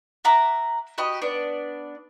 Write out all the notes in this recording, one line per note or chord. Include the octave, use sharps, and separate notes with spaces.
E5 F#5 A#5 D6
F#4 G4 D#5 B5
B3 D4 D5